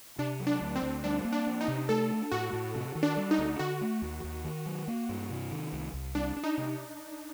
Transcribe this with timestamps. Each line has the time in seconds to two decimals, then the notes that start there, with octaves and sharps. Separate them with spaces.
0.18 C3 D4
0.40 F#3
0.47 D4
0.61 D2
0.76 C4
0.82 D2
1.04 G3 D4
1.25 A#3
1.33 D4
1.47 D4
1.61 D#4
1.68 C3
1.89 A3 A4
2.10 D4
2.32 A2 F#4
2.53 A2
2.75 C3
2.95 D#3
3.03 D4
3.17 G3
3.31 D#4
3.38 D2
3.59 D3 F#4
3.81 A3
4.02 D#2
4.24 D#2
4.44 D#3
4.66 F#3
4.88 A#3
5.09 G2
5.30 C3
5.51 D#3
5.72 C2
5.94 C2
6.15 G3 D4
6.36 D4
6.44 D#4
6.58 C3